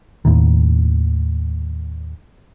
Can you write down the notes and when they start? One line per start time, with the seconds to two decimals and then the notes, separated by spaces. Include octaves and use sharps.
0.25 D#2 A2 D#3